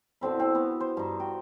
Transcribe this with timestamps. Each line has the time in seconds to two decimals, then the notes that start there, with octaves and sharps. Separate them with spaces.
0.21 B2 D3 C4 E4
0.40 C4
0.55 B3 F#4
0.80 C5
0.97 G2 D#4
1.20 F#4 G5